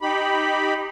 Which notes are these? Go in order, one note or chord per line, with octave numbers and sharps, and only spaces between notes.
D#4 G4 B5